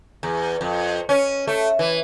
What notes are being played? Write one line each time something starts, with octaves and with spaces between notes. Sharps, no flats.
E2
F2
C#4
A3
E3